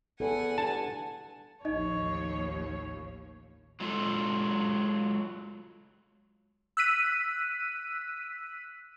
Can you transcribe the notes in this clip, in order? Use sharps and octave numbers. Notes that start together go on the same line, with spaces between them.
E2 A4 F#5 G#5
G2 A5
A1 D#2 F3 D#4 C#5 D#5
F#3 G#3 F4 A4
E6 F#6 B6 D#7